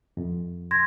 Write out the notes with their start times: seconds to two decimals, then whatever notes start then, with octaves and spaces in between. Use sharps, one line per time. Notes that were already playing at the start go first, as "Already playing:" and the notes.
0.17 F2
0.71 C6 G#6 A#6